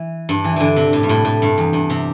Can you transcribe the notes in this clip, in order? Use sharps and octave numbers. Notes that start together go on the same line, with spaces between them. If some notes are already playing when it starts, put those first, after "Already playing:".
Already playing: E3
G2
E3
D3 E3
C3
A2
G2
A2
A2
G2
E2
G2
C3